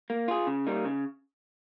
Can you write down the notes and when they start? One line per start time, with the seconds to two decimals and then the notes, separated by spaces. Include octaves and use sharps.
0.10 A#3
0.28 F4 G#4
0.47 C#3
0.66 G3 A#3 D#4
0.85 C#3